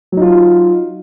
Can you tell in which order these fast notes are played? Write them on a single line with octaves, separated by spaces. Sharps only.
F#3 D#4 F4